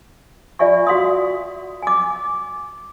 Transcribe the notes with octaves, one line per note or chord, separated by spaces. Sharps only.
F4 D5 E5 G#5 C#6
F#4 F5 C6 D#6
G#5 D6